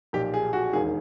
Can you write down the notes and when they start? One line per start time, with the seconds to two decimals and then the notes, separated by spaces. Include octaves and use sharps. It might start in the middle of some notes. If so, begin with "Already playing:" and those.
0.13 B1 A#2 F3 G4
0.34 G#4
0.53 F#4
0.73 E1 D#2 D#3 G#4